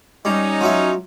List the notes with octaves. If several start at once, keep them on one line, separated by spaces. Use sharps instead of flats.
G3 C#4 D#4
F3 F#3 E5